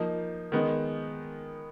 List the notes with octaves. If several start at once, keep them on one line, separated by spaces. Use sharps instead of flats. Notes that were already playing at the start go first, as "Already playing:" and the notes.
Already playing: F3 A#3 D#4
D#3 G#3 B3 D#4